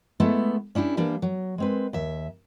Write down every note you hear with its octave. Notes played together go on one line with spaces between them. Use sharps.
G#3 A3 B3 E4 A4
C#4 D4 E4 F#4 G4
E3 G3 A#3 D4
F#3
G#3 C4 B4
D#2 E5